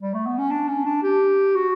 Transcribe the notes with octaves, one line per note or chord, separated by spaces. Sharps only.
G3
A3
B3
C#4
D4
C#4
D4
G4
F#4